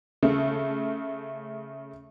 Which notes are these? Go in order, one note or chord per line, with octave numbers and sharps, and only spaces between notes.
C#3 A3